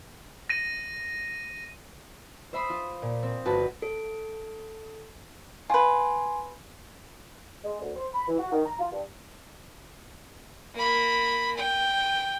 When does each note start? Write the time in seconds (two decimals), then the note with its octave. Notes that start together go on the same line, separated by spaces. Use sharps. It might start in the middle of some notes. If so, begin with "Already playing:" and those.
0.49 A#6 D#7
2.53 C5 E5 B5 C6 D#6
2.70 F4
3.02 A#2
3.23 C4
3.45 G1 F#4 B4 A5
3.82 A4
5.70 F4 B4 G#5 C6
7.64 G#3
7.81 D2
7.95 C5
8.14 B5
8.28 E3
8.39 F#4
8.52 D#3
8.66 A#5
8.78 F4
8.92 G2
10.74 A#3 B5
11.56 G5